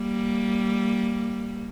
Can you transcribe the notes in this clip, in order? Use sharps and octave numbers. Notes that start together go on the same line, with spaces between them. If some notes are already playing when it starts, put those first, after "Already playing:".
Already playing: G3 A#3